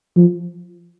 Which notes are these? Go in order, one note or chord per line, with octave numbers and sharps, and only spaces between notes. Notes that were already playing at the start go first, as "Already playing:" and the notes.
F3